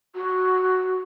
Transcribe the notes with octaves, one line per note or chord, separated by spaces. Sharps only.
F#4